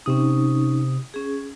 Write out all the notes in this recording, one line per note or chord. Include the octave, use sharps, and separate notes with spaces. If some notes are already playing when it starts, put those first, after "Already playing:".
C3 C#4 D#4 D#6
C#4 G#4